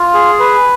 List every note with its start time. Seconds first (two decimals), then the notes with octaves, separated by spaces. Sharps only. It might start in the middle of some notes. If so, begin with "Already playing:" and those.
Already playing: F4
0.14 G#4
0.39 B4